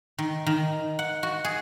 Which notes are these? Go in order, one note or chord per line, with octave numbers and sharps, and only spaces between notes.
D#3
D#3
F#5
F#4
G#4